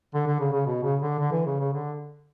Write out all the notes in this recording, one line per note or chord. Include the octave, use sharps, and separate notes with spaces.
D3
D3
C#3
C#3
B2
C#3
D3
D3
E3
C#3
C#3
D3